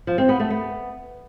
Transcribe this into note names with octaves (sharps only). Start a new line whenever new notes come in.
F3
C4
B3
A3
B3